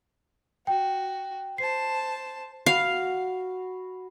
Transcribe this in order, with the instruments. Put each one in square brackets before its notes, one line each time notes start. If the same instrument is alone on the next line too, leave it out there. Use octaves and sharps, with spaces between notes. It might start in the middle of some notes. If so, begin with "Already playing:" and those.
[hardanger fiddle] F#4 [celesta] G5
[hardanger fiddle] C5 A5 [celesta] C7
[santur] F#4 B5 [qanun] F5